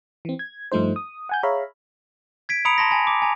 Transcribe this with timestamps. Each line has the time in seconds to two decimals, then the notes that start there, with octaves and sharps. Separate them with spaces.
0.25 E3 C4
0.39 G#6
0.72 G2 F3 A3 D#4 C5
0.96 D#6
1.29 F#5 G#5 G6
1.43 G#4 C#5 E5 F5 A#5 B5
2.49 G#6 B6 D7
2.65 A#5 B5 D#6 C#7 D7 F7
2.78 A5 C6 A#6
2.91 G#5 A5 B5
3.07 D6
3.22 G#5 A#5